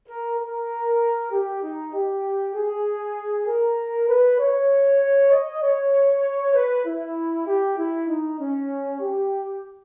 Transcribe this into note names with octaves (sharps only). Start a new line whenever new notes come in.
A#4
A#4
G4
D#4
G4
G#4
A#4
B4
C#5
D#5
C#5
B4
E4
G4
E4
D#4
C#4
G4